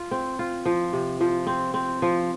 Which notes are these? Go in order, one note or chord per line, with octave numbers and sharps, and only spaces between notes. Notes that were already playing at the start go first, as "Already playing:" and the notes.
Already playing: F4
C4
F4
F3
C3
F3
C4
C4
F3